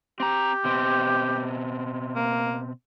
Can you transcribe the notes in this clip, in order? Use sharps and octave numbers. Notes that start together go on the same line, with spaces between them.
C4 G4 A#5
B2 C4
A#3